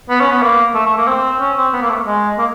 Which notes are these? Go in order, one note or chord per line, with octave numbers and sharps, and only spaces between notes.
B3
C#4
B3
A#3
A3
A3
A#3
C4
C#4
C4
B3
A#3
A3
G#3
A#3